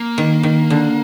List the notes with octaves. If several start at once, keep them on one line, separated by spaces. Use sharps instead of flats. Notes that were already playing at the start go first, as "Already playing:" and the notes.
Already playing: A#3
D#3
D#3
D3